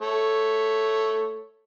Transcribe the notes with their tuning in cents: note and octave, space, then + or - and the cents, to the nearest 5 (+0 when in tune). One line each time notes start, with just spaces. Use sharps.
A3 +0 C#5 +0